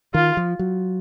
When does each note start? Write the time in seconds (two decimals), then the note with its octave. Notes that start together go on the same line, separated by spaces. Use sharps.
0.14 D#3 F4
0.37 F3
0.59 F#3